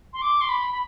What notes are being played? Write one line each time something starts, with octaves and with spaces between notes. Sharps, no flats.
C6
D6
C6
B5
B5